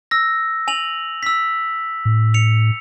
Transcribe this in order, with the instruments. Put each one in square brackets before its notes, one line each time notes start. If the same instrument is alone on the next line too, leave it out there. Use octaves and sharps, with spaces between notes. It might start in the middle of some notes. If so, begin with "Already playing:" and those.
[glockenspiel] E6 A#6
G#5 F7 F#7
E6 B6
[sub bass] A2
[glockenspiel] C#7 F7